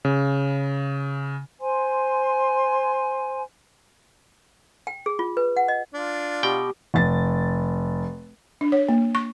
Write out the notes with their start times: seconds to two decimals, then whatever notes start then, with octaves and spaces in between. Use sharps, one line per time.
0.05 C#3
1.60 C5 G#5 C6
4.87 G5
5.06 G#4
5.19 F4
5.37 B4
5.57 F#5
5.68 D#5
5.94 D4 F4
6.43 B2 G4 G5
6.94 F1 A6
8.61 D4
8.72 C#5
8.89 A#3
9.15 C#6